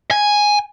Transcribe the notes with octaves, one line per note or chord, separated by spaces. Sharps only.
G#5